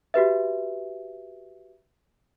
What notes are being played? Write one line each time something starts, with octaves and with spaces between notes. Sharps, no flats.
F#4 G4 B4 E5